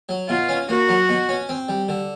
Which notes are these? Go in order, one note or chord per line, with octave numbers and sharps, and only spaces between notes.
F#3
B2 F4
C#4
A#3 F#4
F#3
B2
C#4
C4
G3
D3